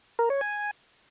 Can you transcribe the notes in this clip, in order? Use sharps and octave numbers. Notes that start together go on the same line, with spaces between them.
A#4
C#5
G#5